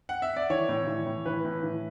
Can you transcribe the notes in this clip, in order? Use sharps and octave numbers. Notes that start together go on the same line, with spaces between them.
F#5
E5
D5
E3 C#5
A2
E3
A2
E3 B4
A2
E3